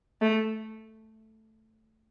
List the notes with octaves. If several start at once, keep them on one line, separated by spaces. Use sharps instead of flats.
A3